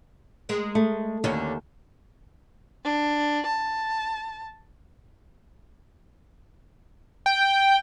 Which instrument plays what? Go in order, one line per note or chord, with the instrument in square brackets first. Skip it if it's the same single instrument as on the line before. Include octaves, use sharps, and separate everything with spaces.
[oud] G#3 A#4
[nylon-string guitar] A3
[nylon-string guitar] D#2 [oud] D3 C#4
[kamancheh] D4
A5
[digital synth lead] G5